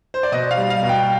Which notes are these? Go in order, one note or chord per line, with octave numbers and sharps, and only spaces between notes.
C5
D5
B2 D#5
F5
G3
F5
B2
G5